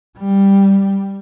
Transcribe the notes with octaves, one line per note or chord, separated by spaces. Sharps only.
G3